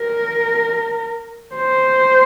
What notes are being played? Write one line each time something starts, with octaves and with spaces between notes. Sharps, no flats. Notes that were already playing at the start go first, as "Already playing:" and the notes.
Already playing: A#4
C5